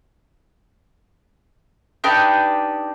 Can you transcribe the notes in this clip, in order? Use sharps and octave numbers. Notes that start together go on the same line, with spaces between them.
D4 D#4 G4 B4